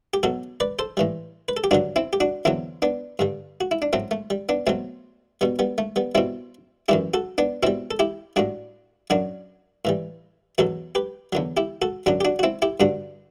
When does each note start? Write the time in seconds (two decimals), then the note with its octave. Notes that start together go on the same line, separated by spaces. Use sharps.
0.14 G4
0.23 B2 F#3 F#4 A4
0.60 B4 D5
0.79 A4 C5
0.97 A2 E3 G3
1.48 B4
1.57 A4
1.64 G4
1.71 G2 D3 F#3 D4 F#4
1.96 C4 E4
2.13 G4
2.20 D4 F#4
2.45 E2 D3 F#3 C4 E4
2.82 B3 D4
3.19 G2 D3 G3
3.61 F#4
3.71 E4
3.82 D4
3.93 A2 F#3 A3 C4
4.11 A3
4.30 G3
4.49 B3 D4
4.67 B2 F#3 A3 C4
5.41 B2 G3 B3
5.59 G3 B3
5.78 A3
5.96 G3 B3
6.15 B2 G3 C4 E4
6.88 F#2 E3 G3 E4 G4
7.14 F#4 A4
7.38 B3 D4
7.63 B2 G3 C4 E4
7.91 A4
7.99 E4 G4
8.36 A2 G3 D4 F#4
9.10 F#2 F#3 D4 F#4
9.85 A2 E3 G3
10.58 E2 B2 F#3 F#4 A4
10.95 G4 B4
11.33 E2 D3 F#3
11.57 E4 G4
11.82 F#4 A4
12.06 F#2 D3 F#3 D4 F#4
12.21 G4
12.25 D4 F#4
12.39 F#4
12.43 C4 E4
12.62 E4 G4
12.80 G2 D3 G3 D4 F#4